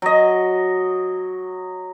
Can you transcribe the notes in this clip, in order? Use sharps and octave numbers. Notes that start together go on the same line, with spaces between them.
F#3 D#5